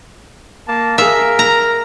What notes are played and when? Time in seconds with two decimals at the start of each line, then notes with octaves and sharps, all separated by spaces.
0.67 A#3 A5
0.98 G#4 A#4 E5 F5
1.39 A#5